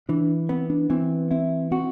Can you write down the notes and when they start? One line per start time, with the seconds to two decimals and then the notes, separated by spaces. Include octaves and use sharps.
0.09 E3 D4
0.49 B3 C4
0.70 D4
0.90 E3 C4
1.31 C4 E4
1.71 C4 F#4